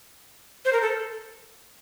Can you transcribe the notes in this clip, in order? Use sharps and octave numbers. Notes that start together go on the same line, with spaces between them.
C5
A#4
A4